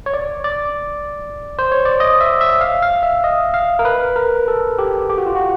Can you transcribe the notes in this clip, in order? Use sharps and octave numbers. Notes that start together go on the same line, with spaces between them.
C#5
D5
D5
C5
C#5
D5
D#5
E5
E5
F5
F5
E5
D#5
F5
A#4
B4
A#4
A4
G4
G4
F#4
F4
F#4